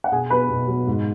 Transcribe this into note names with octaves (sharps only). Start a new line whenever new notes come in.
F#5
B2 G#4 G#5
F#3 B3 B4 B5
B2
F#3 B3
G#2